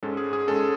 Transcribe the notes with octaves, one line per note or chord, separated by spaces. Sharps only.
G#2 G#3 C#4 A4
G#4
G#4
G#2 G#3 C#4 A4